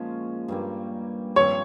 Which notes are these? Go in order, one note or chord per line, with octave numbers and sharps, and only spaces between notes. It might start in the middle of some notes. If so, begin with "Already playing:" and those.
Already playing: A#2 F3 G#3 C#4
G2 G3 A#3
G2 F3 C4 C#5